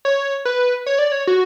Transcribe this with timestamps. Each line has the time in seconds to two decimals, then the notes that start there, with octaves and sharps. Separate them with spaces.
0.05 C#5
0.45 B4
0.86 C#5
0.99 D5
1.12 C#5
1.27 F#4